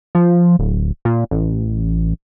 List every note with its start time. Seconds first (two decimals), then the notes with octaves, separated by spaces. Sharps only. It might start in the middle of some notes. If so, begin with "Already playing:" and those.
0.15 F3
0.59 D1
1.05 A#2
1.31 A1